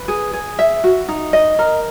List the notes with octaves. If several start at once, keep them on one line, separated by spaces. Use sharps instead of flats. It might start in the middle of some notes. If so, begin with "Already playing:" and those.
Already playing: B4
G#4
G#4
E5
F#4
D#4
D#5
A#4